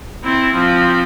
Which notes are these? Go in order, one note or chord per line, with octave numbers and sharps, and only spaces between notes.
C4 E4
F3 C4